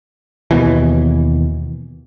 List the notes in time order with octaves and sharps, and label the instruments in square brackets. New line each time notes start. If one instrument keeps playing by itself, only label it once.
[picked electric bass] D#2 B2 E3